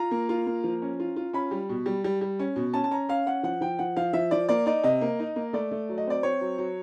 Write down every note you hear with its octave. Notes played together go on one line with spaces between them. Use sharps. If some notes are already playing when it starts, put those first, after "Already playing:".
Already playing: F4 A#5
A#3
F4
A#3
F3
C#4
F4
F4
C#4 B5
G3
B2
G3
G3
G3
C#4
B2
C#4 A5
A5
C#4 A#5
C#4 F5
C#4 F#5
F3 F#5
F3 G5
F3 F#5
F3 F5
F3 E5
F3 D5
A#3 D5
D#4 D5
C3 D#5
A#3
D#4
A#3
A3 D5
A3
F#3
D#5
C4 D5
C4 C#5
F#3
F#3